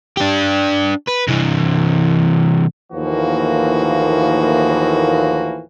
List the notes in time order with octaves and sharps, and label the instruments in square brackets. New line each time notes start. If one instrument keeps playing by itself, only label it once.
[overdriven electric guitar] D4 G4
B4
C3 E3
[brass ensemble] D#2 A2 E3 F3 A#3 F#4